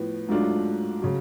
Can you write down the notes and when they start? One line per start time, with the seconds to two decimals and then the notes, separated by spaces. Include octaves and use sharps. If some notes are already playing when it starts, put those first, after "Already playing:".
Already playing: A2 F3 B3
0.29 G#2 F#3 A3 D4 F4
1.02 C#3 F#3